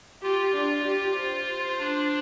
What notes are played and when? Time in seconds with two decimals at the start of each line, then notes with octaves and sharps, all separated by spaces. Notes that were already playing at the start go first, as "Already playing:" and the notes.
0.22 F4 G4
0.54 D4
0.85 G4
1.17 C5
1.79 D4